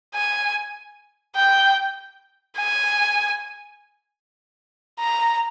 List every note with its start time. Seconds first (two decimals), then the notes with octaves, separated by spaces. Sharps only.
0.15 G#5
1.36 G5
2.57 G#5
5.00 A#5